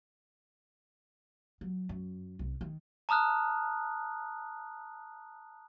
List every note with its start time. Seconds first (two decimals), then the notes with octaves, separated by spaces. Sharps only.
1.61 F#3
1.89 F#2
2.39 C2
2.61 D#3
3.09 A5 A#5 D#6 F6 F#6